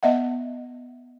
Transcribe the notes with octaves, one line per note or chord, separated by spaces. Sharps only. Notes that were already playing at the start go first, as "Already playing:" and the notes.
B3 D#5 E5 F#5